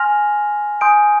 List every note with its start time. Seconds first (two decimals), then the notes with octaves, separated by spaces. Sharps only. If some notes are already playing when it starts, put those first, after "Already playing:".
Already playing: G#5 C6 F6 A#6 F7
0.81 G#5 C6 D#6 G6 D7